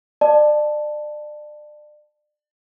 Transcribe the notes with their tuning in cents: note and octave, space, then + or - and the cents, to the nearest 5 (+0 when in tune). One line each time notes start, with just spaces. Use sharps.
D5 +30 A5 +0